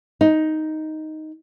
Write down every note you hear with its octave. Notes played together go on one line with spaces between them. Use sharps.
D#4